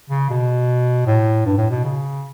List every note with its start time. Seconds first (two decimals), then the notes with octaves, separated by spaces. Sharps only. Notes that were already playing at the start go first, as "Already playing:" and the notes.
0.10 C#3
0.30 B2
1.07 A2
1.46 G2
1.58 A2
1.70 B2
1.84 C#3